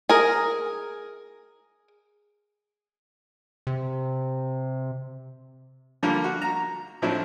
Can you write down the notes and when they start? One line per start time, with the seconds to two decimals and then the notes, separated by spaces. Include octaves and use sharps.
0.09 G#4 A#4
3.67 C3
6.03 D3 F3 G3 A#3
6.24 F#4
6.42 A#5
7.02 A2 F3 F#3 C4 D4